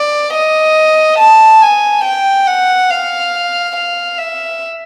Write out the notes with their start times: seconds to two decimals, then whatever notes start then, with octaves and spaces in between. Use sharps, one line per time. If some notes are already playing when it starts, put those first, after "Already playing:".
Already playing: D5
0.34 D#5
1.19 A5
1.61 G#5
2.04 G5
2.47 F#5
2.90 F5
3.75 F5
4.18 E5